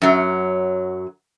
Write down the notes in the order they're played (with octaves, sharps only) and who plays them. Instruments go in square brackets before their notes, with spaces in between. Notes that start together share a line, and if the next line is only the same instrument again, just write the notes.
[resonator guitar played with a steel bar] F#2 F#3